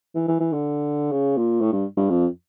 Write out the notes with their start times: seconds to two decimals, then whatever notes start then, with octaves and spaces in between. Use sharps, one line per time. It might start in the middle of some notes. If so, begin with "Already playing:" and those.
0.15 E3
0.28 E3
0.40 E3
0.52 D3
1.12 C#3
1.37 A#2
1.61 A2
1.73 G2
1.97 G2
2.10 F2